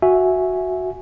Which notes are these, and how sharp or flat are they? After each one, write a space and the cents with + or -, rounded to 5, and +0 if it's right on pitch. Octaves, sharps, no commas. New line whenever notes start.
F#4 -5 E5 +0 G#5 +0